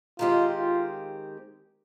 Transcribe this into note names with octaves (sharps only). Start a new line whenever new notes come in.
D#3 G#3 C4 F4 G4
F4